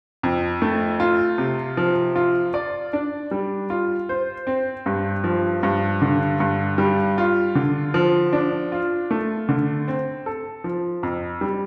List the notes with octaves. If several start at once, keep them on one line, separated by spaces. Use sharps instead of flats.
F2
A3
F4
C3
F3
F4
D5
D4
G3
F4
C5
C4
G2
F3
G2
D3
G2
G3
F4
D3
F3
D4
F4
A3
D3
C4
A4
F3
F2
G3